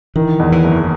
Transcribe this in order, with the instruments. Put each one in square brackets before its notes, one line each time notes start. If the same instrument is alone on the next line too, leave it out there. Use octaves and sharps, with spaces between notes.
[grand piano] D#3 [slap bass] E3
[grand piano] E2
[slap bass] E3
[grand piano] F#1